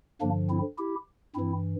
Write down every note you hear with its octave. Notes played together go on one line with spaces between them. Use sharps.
G2 D3 F3 A#3 D4
C4 E4
E4 G4
G2 E3 C4 E4